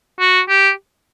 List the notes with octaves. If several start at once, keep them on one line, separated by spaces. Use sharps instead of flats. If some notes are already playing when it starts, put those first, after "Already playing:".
F#4
G4